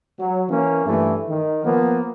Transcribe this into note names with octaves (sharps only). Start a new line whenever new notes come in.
F#3
E3 A#3 C#4
G2 E3 A3
D#3
F3 A#3 B3